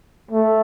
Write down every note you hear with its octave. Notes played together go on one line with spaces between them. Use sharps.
A3